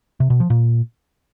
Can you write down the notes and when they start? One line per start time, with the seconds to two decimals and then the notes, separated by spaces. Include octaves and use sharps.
0.20 C3
0.30 B2
0.40 F3
0.50 A#2